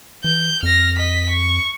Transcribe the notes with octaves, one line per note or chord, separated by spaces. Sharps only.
E3 G6
F2 F6 A#6
D#5 B6
C#6